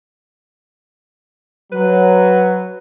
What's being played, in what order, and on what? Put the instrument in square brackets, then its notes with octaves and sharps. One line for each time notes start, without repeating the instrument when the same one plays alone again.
[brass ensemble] F#3 [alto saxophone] B4